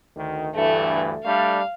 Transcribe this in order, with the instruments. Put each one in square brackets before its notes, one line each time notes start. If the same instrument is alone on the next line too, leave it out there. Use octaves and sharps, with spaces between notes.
[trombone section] D2 D#3
[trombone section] D2 G2 E3 [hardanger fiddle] A3
[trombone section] G3 A3 D4 [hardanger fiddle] F5